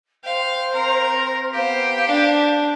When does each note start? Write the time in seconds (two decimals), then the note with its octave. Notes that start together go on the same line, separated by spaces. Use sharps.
0.24 C5 F5 G5
0.73 C4 A#4 A#5
1.53 B3 G4 C5 F5
2.07 D4